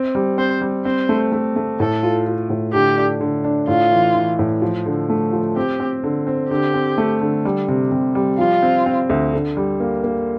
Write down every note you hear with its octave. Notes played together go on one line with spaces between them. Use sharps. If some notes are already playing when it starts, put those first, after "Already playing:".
Already playing: C4
G3
C4 C5
G3
C4 C5
A3
A3
A3
A2 A4
F4
F4
A2
D3 G4
D4
D3
D4
A2 F4
E3
E3
A2
F3
D3
A3
F3
C4 G4
C4
D3
C4
D3 G4
C4
A3
D3
G3
C3
C3
G3
F3 F4
C4
C4
D2
D3
G3
A#3
A#3